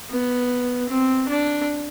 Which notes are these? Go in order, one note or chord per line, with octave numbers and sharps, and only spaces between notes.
B3
C4
D4